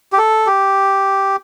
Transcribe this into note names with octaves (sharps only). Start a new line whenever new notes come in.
G4
A4
G4